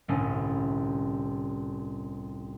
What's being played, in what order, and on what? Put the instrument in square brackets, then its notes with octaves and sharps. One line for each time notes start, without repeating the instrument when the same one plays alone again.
[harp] G1 C2 A2 C#4 E4